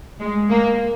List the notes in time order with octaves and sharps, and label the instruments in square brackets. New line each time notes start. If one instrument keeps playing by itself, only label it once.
[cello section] G#3
A#3